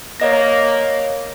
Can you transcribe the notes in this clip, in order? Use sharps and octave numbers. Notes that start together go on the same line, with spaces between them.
A#3 C#5 D#5 A#6